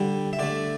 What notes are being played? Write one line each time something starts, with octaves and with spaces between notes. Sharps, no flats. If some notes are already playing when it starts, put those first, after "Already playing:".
Already playing: D3 G3
E5
D3 A3 D5